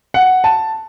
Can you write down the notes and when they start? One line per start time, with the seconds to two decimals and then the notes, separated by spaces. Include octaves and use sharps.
0.14 F#5
0.44 A5